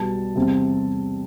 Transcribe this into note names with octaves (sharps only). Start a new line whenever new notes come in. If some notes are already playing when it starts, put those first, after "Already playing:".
Already playing: B1 B2 G3 B3 A5
E2 C3 G3 C4